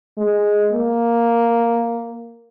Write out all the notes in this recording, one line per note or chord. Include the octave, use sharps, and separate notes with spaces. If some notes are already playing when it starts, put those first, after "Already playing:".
G#3
A#3